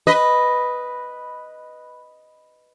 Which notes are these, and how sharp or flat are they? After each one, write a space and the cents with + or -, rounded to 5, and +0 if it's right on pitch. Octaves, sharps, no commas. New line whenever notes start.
B4 +0 D#5 +0